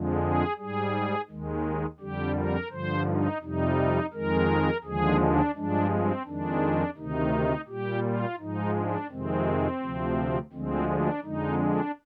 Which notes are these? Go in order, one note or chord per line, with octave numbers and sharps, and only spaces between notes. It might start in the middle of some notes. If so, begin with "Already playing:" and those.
Already playing: F2 D3 F3 G#3
G#4
G#2 G3 G#4
D#2 D#3 G#3
F2 D3 G3 G4
A#4
G2 D3 F3 C5
D#4
F2 C3 G3 D#4
F2 D#3 G#3 A#4
D#2 D3 F3 G#3 G#4
D4
G2 F3 G#3 D4
C4
F2 D#3 G#3 D4
D2 C3 D#3 D#4
A#2 G3 G4
F4
G#2 F3 G#3 D#4
D4
F2 C3 D#3 G#3 C4
D2 C3 F3
D2 D3 F3 G#3 C4
D4
F2 D3 G#3 D#4
D4